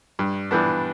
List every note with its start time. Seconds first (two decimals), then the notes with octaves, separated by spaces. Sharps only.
0.19 G2
0.51 E3 G3 B3 D4